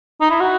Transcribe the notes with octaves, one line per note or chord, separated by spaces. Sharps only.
D#4
E4
F#4